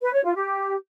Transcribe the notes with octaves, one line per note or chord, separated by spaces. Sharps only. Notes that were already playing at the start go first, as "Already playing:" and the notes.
B4
C#5
F4
G4